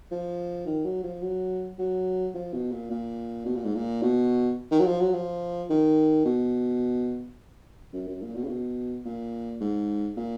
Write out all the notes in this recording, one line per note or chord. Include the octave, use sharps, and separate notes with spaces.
F3
D#3
F#3
F3
F#3
F#3
F3
B2
A#2
A#2
B2
A#2
G#2
A#2
B2
D#3
F#3
F3
F#3
F3
D#3
B2
F#2
F#2
A#2
B2
C#3
B2
A#2
G#2
A#2